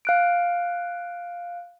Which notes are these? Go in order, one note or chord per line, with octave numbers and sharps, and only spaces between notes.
F5 F#6 D7